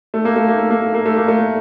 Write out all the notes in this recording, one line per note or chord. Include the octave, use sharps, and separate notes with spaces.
A3
A#3
A3
A#3
A3
A#3
A3
A#3
A3
A#3
A3